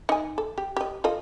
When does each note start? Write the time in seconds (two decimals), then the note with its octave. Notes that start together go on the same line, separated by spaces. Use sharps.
0.09 D#4 G#5
0.38 A4
0.58 G4
0.77 G4 D#5
1.04 F4 A4 D#5